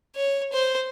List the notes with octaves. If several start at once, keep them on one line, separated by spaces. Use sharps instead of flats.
C#5
C5